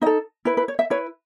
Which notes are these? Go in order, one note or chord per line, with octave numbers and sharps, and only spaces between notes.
D#4 A4 D#5
E4 B4
B4
C#5
E5
E4 B4 C#5